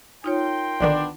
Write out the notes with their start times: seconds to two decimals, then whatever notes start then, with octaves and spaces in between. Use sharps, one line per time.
0.24 D#4 F4 A#4 C#5 G5 C6
0.80 A#1 D3 D#3 B3 D4 F#5